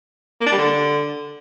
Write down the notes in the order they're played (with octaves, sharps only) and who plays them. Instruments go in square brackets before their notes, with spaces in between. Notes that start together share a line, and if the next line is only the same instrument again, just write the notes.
[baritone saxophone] A#3
D4
G3
D3